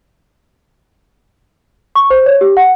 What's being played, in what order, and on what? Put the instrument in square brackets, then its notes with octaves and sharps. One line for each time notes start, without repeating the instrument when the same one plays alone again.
[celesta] C#6
C5
C#5
G4
F#5